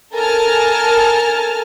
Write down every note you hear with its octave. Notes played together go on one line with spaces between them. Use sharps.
A4 A#4 G#5 A5 F6